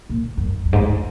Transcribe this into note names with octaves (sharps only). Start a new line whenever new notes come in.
A#2
F#2
F#2
G#2
F#2